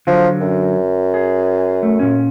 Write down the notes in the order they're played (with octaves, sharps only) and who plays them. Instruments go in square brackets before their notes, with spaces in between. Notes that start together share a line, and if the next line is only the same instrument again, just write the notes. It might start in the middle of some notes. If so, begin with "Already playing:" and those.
[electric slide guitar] D3 F#3 [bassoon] F3
[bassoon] F#2
[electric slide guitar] G#4
A3
A#2 C#4